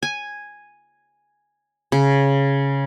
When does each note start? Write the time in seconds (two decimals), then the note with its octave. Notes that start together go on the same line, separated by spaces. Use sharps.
0.03 G#5
1.92 C#3